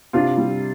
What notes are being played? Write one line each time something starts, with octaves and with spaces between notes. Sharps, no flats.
C3 D4 F4
G3